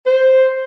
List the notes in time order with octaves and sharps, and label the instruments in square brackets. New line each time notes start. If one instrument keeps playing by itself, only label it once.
[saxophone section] C5